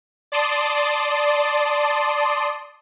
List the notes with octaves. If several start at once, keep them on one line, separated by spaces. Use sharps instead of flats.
D5 A5 C6 D#6